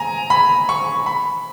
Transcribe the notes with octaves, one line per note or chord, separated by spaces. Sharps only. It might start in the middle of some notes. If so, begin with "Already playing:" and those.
Already playing: G#5 A#5
B5
C#6
B5